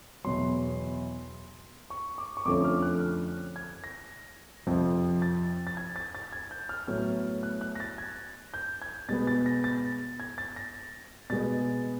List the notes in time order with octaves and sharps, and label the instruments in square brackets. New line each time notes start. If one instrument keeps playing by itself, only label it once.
[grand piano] E2 B2 F#3 C6
C#6
D6
C#6
F2 D3 F3 A3 C#4 D6
F6
F#6
F6
G#6
A#6
F2 C3 F3
A6
A6
G#6
A6
A6
G#6
G6
F6
A2 F#3 B3 F6
F#6
F#6
A#6
A6
G#6
G6
G#6
B2 G#3 B3 A6
A6
A#6
A6
G#6
A6
A#6
B2 G#3 B3 A6